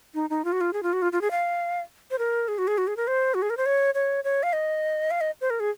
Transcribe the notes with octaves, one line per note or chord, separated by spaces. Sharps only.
D#4
D#4
F4
F#4
F4
G#4
F4
F#4
F4
F4
G#4
F5
C5
A#4
G#4
F#4
G#4
F#4
G#4
A#4
C5
F#4
G#4
A#4
C5
C#5
C#5
C#5
F5
D#5
F5
D#5
C5
A#4
G#4